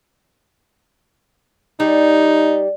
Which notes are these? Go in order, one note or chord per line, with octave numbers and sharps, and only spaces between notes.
G3 D#4